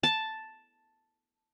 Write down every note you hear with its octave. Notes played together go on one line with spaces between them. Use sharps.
A5